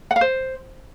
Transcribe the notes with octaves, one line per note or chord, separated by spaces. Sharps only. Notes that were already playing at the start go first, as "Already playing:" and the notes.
F#5
F5
C5